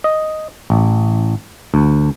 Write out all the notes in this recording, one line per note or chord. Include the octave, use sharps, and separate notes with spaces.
D#5
A1
D2